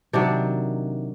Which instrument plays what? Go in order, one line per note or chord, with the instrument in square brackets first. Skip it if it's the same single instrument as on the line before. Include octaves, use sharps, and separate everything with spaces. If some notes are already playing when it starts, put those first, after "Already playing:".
[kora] C3 D#3 F#3 D4 D5